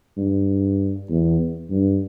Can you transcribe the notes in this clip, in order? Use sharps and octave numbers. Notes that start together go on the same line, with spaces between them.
G2
E2
G2